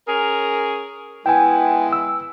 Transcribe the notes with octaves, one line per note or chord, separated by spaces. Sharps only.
C#4 G#4 A#4
G#3 B3 E4 G5 G#5
E6